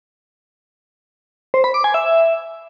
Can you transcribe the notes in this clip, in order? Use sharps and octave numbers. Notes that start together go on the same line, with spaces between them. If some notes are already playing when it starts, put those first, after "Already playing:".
C5
B5
D6
G#5
E5